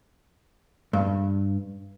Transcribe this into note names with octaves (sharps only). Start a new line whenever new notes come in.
G2